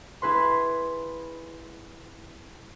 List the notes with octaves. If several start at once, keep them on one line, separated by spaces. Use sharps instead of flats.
E4 G#4 B4 C6